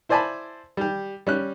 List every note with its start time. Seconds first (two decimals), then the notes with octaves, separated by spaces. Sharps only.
0.09 E4 C5 D5 G#5 A5 B5
0.77 G3 G4
1.27 G3 C#4 F#6